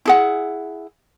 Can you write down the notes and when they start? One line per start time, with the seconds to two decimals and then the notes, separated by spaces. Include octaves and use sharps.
0.05 E4 G#4 F#5